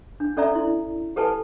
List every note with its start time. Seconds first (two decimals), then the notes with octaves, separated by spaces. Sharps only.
0.20 D4
0.37 C#4 A4 D5 E5 A#5
0.55 E4
1.16 G4 A4 B4 G#5 A5